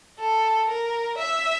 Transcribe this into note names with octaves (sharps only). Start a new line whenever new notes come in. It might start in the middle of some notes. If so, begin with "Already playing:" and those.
A4
A#4
E5